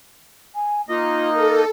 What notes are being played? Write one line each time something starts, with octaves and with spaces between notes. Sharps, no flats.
G#5
A#3 D#4 F4 D#5
A4 A#4